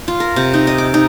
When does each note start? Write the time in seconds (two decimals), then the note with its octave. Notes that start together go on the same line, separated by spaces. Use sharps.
0.08 F4
0.20 A#4
0.36 C3
0.54 D#4
0.67 D#5
0.78 D6
0.94 D#4